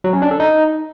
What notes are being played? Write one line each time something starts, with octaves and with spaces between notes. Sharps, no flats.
F#3
C#4
D4
A4
D#4